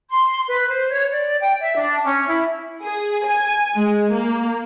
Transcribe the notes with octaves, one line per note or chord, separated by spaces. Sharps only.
C6
B4
C5
C#5
D5
G5
E5
D4
C#4
E4
G#4
G#5
G#3
A#3